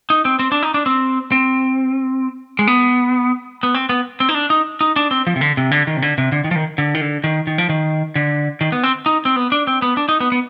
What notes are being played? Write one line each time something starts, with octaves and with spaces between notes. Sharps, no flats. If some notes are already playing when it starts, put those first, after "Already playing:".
D#4
C4
C4
D4
D#4
D4
C4
C4
G#3
B3
B3
C4
B3
C4
D#4
D4
D#4
D#4
D4
C4
F3
C3
D3
C3
D3
D#3
C3
D3
C3
D3
D#3
F3
D#3
D3
D#3
D3
D#3
D#3
F3
D#3
D3
D#3
B3
C4
D#4
C4
B3
D4
C4
B3
D4
D#4
B3
B3